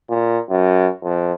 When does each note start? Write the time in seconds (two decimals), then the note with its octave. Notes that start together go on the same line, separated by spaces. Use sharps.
0.10 A#2
0.49 F#2
1.03 F2